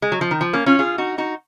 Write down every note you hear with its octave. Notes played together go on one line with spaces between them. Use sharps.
G#3
F#3
F3
D#3
F3
A#3 C#4
C#4 F4
F4 G#4
D#4 F#4
D#4 F#4